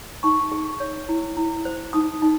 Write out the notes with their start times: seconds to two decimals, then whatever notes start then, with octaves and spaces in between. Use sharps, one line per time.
0.23 D#4 C#6
0.52 G#4
0.80 C#5
1.09 E4
1.37 E4
1.65 C5
1.93 D#4 D#6
2.22 D#4